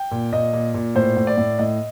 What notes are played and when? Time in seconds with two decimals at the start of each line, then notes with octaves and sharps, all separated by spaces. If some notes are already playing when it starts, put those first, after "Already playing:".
Already playing: G5
0.11 A#2
0.33 A#2 D#5
0.53 A#2
0.74 A#2
0.95 A2 C5
1.17 A2
1.27 D5
1.37 A2
1.58 A2 D#5